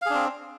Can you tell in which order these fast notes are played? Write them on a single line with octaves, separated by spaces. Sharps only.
F5 G#4 D4 C4